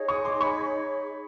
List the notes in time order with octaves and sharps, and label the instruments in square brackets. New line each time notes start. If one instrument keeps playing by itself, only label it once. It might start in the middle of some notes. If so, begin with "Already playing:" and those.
Already playing: [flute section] D#4 G#4 C#5
[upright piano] C#6 D#6
C6 D6
B5 C#6